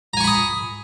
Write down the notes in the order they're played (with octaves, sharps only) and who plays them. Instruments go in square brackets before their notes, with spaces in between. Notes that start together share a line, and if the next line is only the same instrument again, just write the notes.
[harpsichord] A#5
G#5
C#6
B5
D#6